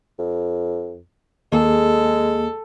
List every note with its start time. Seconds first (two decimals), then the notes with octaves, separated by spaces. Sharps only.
0.19 F2
1.52 D#2 G#3 A#3 G#4 A4